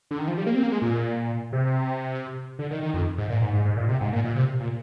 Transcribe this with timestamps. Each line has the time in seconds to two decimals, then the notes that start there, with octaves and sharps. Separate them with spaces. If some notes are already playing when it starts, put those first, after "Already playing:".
0.11 D3
0.19 D#3
0.28 F3
0.37 G3
0.46 A#3
0.55 C4
0.63 A#3
0.72 G#3
0.82 A#2
1.52 C3
2.59 D3
2.71 D#3
2.82 D#3
2.94 F2
3.18 G#2
3.30 A#2
3.42 G#2
3.53 G#2
3.65 G#2
3.77 A#2
3.89 C3
4.01 G#2
4.13 A#2
4.24 A#2
4.36 C3
4.60 A#2